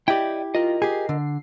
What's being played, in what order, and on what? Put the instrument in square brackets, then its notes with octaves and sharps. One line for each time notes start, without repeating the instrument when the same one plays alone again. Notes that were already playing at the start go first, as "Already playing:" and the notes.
[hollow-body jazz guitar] E4 G4 [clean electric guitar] D5 D#5 G5
[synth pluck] F4 [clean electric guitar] A#4 D#5
[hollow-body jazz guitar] G4 G#4 [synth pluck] C7
[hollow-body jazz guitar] D3